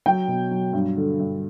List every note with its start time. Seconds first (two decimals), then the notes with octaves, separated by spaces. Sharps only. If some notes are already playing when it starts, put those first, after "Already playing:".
0.06 F#3 G5
0.28 B2
0.51 F#3
0.73 G2
0.97 D3
1.20 G2